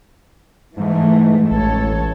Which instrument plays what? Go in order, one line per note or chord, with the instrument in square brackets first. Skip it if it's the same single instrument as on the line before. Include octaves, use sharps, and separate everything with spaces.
[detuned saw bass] G#2 [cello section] E3 G#3 A3
[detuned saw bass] A1 [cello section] A4 C#5